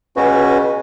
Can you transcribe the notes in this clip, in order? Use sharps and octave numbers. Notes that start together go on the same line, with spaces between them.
C#2 B2 C#4 F#4